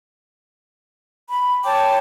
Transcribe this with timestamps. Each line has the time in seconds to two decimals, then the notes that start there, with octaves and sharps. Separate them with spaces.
1.29 B5
1.65 C#5 G5 A5 D6